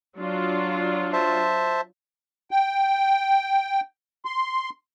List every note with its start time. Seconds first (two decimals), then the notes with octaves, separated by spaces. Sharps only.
0.18 F#3 D4 F4
1.13 C5 E5 A5
2.51 G5
4.25 C6